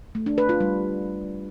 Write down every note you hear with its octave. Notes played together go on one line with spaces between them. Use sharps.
A3
D4
B4
F4
G3